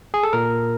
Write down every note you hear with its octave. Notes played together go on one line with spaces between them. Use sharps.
G#4
A4
A#2 A#4